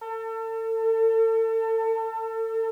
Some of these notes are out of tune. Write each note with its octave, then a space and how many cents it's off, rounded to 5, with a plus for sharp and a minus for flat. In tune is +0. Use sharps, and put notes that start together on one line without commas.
A4 +35